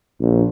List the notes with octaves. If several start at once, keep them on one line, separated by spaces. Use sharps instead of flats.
A#1